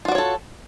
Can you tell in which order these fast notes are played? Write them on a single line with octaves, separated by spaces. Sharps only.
F4 F#4 D5 C#5 A4